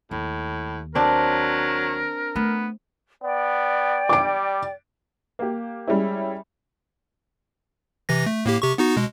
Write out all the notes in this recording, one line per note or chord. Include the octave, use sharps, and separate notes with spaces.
D#2 A2
F#3 C4 D4 A#4
A3 B3
B3 D5 G5
G3 D6 D7
A#3 G4
G3 G#3 C#4 E4
C3 E3 A#6
A3
A2 A#3 G4
C3 G4 C#6
B3 D#4 F#4
B2 G#3